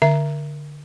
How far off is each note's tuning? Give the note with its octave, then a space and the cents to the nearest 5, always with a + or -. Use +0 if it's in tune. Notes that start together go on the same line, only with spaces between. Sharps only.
D3 +0 E5 +15